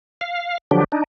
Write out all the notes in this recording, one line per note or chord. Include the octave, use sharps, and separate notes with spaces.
F5
D3 F3 F#3 D4 G4
D4 D#4